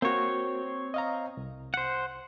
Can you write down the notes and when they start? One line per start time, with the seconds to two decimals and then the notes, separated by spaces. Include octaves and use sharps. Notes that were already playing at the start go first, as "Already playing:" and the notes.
0.02 A#3 C4 F#4 C#5
0.94 D#5 F5 A#5
1.37 C2
1.74 C5 F#5